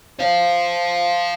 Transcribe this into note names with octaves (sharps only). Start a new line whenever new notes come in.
C5 F5